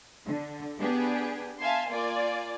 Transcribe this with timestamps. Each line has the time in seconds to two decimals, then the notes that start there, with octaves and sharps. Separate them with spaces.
0.25 D3
0.79 B3 D4 G4 G#4
1.60 E5 F5 G#5 A5 C6
1.89 A#3 F4 D5 G#5